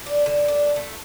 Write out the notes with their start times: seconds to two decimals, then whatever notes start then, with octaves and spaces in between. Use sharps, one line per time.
0.06 D4
0.26 D3
0.48 D4
0.76 A3